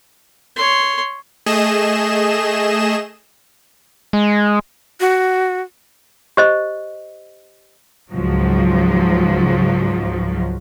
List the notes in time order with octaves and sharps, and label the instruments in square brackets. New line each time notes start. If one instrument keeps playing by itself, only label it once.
[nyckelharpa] C#5 C6
[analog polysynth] A3 G#4 D#5 E7
[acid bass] G#3
[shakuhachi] F#4
[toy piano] G4 C5 D#5
[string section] C#2 G#2 F3 F#3